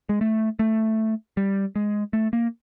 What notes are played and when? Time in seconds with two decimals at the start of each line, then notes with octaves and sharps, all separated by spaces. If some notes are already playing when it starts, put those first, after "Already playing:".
0.09 G#3
0.21 A3
0.59 A3
1.37 G3
1.76 G#3
2.13 A3
2.33 A#3